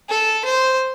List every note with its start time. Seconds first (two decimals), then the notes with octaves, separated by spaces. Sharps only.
0.09 A4
0.45 C5